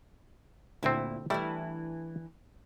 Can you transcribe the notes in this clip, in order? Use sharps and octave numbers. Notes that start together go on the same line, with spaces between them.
D2 A#2 C4 E4
E3 G3 A3 D4 E4